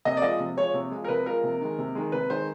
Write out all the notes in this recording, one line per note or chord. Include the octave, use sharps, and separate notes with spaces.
C3 D#5
D5
F3 G#3 D#5
C3
F3 G#3 C#5
C3
F3 G#3
A#4
C3 B4
F3 G#3 A#4
C3
D#3 G#3
C3
D#3 G#3
C3 B4
D#3 G#3 C5